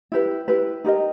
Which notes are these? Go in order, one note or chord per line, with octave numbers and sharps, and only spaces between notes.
E4 G4 B4
E4 G4 B4
D#4 G4 A#4 D#5